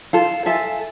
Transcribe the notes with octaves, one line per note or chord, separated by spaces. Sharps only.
F4 A4
F4 A4 E5 G#5